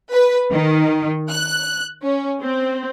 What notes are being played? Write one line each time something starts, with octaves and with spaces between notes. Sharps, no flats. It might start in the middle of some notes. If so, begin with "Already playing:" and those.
B4
D#3
F#6
C#4
C4